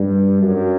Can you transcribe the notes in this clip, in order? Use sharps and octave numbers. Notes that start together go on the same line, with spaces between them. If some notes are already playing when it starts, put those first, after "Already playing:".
Already playing: G2
F#2